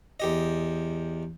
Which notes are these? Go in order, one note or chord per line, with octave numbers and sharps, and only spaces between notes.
E2 G4 D#5